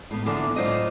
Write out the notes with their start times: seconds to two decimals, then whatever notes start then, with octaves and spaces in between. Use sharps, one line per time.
0.11 A2 B3
0.26 D3 E3 F3 A#3 B3 D4
0.56 A2 F#3 F4 C5 D5 D#5